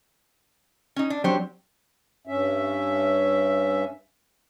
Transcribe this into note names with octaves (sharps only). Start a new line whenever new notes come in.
C#4 D#4
D4
F#3 C4 D4 G4 C5 C#5
G2 C#4 E5